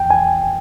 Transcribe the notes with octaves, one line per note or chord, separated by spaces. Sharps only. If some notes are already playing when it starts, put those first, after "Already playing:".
Already playing: E2 G5
G#5